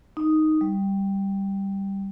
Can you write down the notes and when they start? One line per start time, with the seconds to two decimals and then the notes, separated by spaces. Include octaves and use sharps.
0.17 D#4
0.61 G3